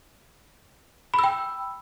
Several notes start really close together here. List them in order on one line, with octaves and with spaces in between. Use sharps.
B5 E6 G5